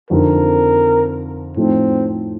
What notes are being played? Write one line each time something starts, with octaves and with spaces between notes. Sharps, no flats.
F2 D3 F3 C4 D#4 A#4
A2 F3 A3 C4 D#4